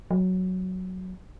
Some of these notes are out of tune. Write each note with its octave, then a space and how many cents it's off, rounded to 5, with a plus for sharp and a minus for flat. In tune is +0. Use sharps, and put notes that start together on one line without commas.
F#3 +0